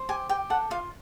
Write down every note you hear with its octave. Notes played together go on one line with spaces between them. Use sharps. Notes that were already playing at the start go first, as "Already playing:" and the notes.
Already playing: C5
G4 G#5
G4 G5
A4 F#5
F4 F5